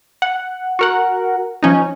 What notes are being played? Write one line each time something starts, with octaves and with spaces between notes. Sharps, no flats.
F#5
F#4 A#4 F#5
F3 C#4 D#4